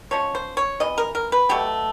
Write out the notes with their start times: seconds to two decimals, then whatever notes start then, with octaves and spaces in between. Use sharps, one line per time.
0.11 F3 G#3 C#4 C#5
0.35 C5
0.57 C#5
0.80 C3 E3 D#5
0.98 A#4
1.15 A#4
1.32 B4
1.49 B2 F#3 A3 G4